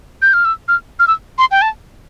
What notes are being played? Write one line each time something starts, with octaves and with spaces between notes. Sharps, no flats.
G6
F6
E6
F6
F6
E6
C6
G5
A5